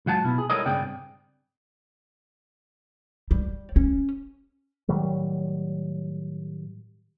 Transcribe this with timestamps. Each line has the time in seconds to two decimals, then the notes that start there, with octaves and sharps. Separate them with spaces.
0.06 C#2 F#3 F#5 A5
0.24 B2 E4
0.38 G#4
0.50 G3 E4 A4 A#4 C#5 D#5
0.66 G2 C#3 C4 G#4 D5 G5
3.31 G3
3.76 C#4
4.89 A2 D#3 F#3 G3